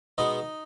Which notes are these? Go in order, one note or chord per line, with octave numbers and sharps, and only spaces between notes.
B2 G#3 B3 D#4 D#5